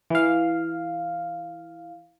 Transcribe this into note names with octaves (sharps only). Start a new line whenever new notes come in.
E3 F5